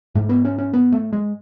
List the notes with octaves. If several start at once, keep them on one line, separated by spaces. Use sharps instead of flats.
G#2 A3
B3
C#4
C#4
B3
A3
G#3